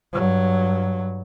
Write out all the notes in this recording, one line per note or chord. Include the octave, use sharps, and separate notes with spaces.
G2 F#3